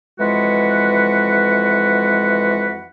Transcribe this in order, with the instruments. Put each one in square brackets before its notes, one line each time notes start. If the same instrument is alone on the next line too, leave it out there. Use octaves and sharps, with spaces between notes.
[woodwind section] F2 E3 G#3 F#4 B4 F#5